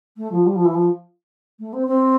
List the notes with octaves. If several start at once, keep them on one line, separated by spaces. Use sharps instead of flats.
A3
F3
G3
F3
E3
F3
A3
C4
C4